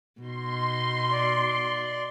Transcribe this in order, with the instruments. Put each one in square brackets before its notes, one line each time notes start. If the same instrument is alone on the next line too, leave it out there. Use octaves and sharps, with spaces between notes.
[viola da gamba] B2 D#4 [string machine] C6
[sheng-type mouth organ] D5